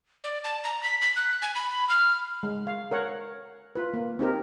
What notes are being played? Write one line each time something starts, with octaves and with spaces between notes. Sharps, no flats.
D5
A5
A#5
B6
B6
F#6
G#5
B5
F6
G#3
F5
A#4 C#5 F#5
F4 B4
A#3
C4 D#4 G4 A#4